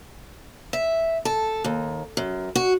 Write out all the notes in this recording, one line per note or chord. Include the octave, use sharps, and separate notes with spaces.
E5
A4
D#2
F#2
F#4